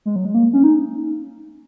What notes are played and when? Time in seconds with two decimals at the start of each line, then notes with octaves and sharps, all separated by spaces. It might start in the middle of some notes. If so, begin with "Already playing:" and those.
0.05 G#3
0.16 F#3
0.25 G#3
0.35 A#3
0.53 C#4
0.64 D#4